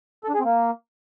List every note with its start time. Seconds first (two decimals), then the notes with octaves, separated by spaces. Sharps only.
0.24 A4
0.29 D4
0.34 G#4
0.40 C4
0.45 A#3